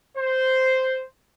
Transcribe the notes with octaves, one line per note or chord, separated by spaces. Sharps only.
C5